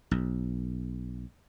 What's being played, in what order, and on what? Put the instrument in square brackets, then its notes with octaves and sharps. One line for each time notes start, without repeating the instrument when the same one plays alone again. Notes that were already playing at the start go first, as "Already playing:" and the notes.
[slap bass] B1